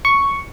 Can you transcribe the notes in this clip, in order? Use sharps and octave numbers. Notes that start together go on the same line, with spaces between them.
C#6